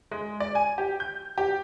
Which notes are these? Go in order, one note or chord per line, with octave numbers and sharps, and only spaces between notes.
G#3
D5
G#5
G4
G6
G4